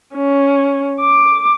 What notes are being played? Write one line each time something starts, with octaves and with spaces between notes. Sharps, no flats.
C#4
D6